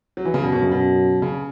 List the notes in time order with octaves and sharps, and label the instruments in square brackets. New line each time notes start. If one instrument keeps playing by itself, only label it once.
[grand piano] F#3
E3
C#3
[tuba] F#2 [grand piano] B2
[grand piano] B2
C#3
B2
C#3